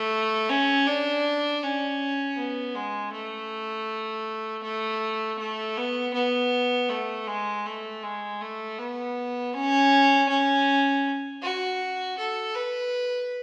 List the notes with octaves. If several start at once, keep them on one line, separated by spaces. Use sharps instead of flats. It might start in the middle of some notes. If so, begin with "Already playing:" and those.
Already playing: A3
C#4
D4
C#4
B3
G#3
A3
A3
A3
B3
B3
A3
G#3
A3
G#3
A3
B3
C#4
C#4
F#4
A4
B4